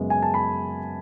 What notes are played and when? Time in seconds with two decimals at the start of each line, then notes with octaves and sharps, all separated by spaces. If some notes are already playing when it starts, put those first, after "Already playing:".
Already playing: F#2 C#3 G#3 B3
0.10 G#5
0.23 A5
0.34 B5